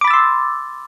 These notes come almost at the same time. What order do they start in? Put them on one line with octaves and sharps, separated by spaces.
D6 B5 A6 E6 C6